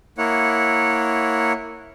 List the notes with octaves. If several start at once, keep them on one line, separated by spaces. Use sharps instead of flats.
A#3 E4 C#5 F#5